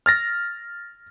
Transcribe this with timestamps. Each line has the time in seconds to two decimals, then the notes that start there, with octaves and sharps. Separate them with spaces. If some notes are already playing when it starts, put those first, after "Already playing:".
0.06 F6 A6 A#6